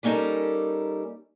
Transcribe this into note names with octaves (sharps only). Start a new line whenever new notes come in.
G3 A#3 C#4 D#4 A4 A#4